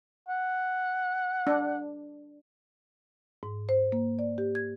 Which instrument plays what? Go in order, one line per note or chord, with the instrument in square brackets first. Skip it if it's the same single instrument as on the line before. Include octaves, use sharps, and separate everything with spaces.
[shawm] F#5
[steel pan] D4
[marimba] G#2
C5
A#3
D5
G4
G#6